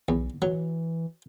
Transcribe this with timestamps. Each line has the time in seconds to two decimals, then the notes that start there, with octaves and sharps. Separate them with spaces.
0.08 B1 E2
0.42 E3 F#3